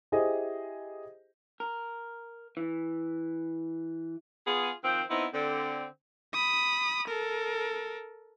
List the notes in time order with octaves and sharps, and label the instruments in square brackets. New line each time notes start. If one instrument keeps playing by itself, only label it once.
[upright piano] E4 G4 G#4 C5 D#5
[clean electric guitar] A#4
E3
[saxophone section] B3 F4 G#4
D#3 F3 C4
B3 C4 D#4 E4
D3 C4
[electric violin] B5 D#6
A4 A#4